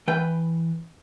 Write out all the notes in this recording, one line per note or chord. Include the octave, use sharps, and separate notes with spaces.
E3 B4 G5